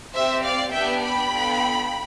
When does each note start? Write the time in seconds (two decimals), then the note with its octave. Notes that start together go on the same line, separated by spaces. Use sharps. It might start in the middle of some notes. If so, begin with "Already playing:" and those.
0.14 C4 G4 C5 E5
0.44 D5 F5
0.73 B3 D4 G4 E5 G5
1.02 G5 B5
1.31 B3 D4 F4 A4